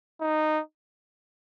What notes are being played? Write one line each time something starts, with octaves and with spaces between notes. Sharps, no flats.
D#4